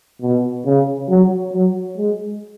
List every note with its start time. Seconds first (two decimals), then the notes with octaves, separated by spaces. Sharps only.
0.22 B2
0.65 C#3
1.09 F#3
1.53 F#3
1.97 G#3